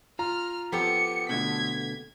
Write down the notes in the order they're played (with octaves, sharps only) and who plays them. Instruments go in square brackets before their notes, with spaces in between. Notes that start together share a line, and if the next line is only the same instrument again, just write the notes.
[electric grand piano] F4 A#5 [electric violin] F6
[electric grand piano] F3 A4 [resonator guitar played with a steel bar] B3 G4 [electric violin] C#7
[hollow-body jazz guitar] B2 D3 A3 [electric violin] G#6 B6